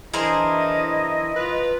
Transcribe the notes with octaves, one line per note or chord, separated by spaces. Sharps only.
E3 D4 E4 G#4 A#4 C5 D#5
F4 B4